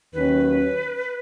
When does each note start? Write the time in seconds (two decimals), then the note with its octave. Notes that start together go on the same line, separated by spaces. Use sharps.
0.13 D#2 D#3 F#3 C#4 B4